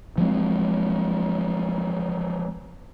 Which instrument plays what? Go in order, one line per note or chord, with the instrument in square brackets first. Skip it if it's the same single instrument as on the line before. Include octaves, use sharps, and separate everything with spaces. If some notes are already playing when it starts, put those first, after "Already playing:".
[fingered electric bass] F3 F#3 G#3 C4